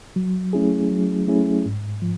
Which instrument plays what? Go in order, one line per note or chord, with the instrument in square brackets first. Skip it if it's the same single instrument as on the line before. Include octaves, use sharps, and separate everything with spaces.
[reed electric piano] F#3
A3 C#4 E4 G#4
F#3
A3 C#4 E4 G#4
G#2
F3